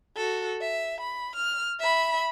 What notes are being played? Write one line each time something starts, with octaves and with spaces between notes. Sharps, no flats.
F#4 A4
E5
B5
F6
E5 B5